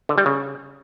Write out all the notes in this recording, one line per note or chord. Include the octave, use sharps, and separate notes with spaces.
D3
G3
C#3